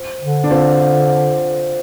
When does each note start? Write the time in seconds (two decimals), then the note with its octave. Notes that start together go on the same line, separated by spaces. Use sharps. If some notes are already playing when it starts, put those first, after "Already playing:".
Already playing: C4 F4
0.21 D3
0.44 D4
0.51 C4 F4